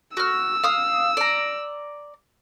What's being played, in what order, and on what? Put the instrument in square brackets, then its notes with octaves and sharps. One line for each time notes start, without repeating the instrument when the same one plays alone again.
[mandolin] F#4 F6 [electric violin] E6
[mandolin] F5 D#6
D5 A#5